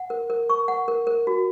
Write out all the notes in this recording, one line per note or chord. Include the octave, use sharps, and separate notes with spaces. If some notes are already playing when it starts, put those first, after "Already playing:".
Already playing: F#5
A#4
A#4
C#6
F#5
A#4
A#4
F#4